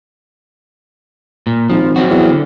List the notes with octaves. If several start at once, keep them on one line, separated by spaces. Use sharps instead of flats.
A#2
G#1 F3
F#3 C4 F#4
E2
D3